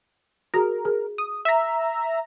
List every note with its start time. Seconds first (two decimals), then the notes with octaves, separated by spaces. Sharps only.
0.54 F#4 G#4 A#4
0.85 G#4
1.18 D#6
1.45 E5 A#5